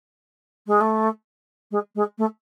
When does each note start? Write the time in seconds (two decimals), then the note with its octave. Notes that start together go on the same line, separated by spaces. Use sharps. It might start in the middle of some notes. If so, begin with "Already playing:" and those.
0.67 G#3
0.80 A3
1.71 G#3
1.95 G#3
2.18 A3